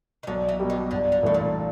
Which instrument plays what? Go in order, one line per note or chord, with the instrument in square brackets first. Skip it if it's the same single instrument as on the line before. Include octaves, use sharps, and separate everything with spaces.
[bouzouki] D#3
[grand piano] B1 [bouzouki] D3
[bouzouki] E3
[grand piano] B2 G3
[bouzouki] D#3
[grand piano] G1 [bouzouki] D3
[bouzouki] D3
[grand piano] G2 E3 A3 [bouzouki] B2
[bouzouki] A#2